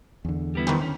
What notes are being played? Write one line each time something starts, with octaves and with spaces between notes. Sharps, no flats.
E2 D3
G3 B3 E4
D#3 E3 C4
D3 C#4